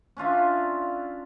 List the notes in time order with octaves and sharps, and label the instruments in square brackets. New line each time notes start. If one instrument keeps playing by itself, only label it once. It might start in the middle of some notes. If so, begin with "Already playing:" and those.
[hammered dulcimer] C#4 D4 F4 E5